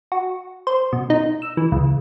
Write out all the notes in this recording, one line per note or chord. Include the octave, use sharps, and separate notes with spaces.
F#4
C5
B2
D#4
E6
E3
C#2